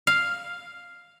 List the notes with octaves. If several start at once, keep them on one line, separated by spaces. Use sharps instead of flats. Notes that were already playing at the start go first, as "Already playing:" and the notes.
F5